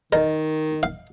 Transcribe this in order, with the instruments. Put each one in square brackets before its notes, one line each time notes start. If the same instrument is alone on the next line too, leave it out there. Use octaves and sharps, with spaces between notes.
[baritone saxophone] D#3 [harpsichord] A#4 [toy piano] D#5
[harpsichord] F5